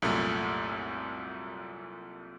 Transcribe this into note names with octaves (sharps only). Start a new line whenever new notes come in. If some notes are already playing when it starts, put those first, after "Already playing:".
C2 F#2 A#2 A3